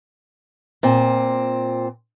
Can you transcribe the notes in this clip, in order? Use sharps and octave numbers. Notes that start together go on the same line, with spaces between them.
A#2 C4